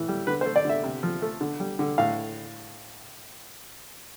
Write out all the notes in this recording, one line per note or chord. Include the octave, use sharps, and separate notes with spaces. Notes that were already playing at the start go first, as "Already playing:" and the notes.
Already playing: A2 E3
G3
D3 B4
C5
A3
D5
D3 E5
C3
F3
A3
D3
G3
D3
A2 F5